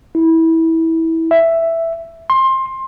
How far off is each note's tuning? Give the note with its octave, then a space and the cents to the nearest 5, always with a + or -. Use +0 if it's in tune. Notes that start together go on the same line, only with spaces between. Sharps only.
E4 -20
E5 +5
C6 +20